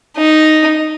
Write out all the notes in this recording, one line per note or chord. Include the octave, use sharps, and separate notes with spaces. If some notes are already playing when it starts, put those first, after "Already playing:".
D#4